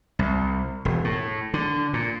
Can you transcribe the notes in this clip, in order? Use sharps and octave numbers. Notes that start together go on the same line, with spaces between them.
C2
E1
A2
D3
A#2